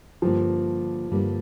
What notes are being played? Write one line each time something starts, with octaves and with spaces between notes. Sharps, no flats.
G2 D3 F3 G3 A#3
G2 D3 G3 A#3